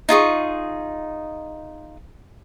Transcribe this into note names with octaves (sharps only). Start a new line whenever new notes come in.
D#4 F4 G#4 C#6